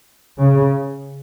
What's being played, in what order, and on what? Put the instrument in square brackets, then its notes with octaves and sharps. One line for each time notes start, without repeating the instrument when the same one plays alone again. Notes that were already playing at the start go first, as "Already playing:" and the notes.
[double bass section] C#3